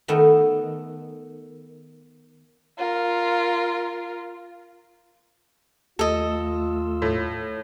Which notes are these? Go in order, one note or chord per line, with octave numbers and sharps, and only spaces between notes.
D#3 A3 B3
F4 A#4
D#2 A3 F4 A4 D#5 E6
A2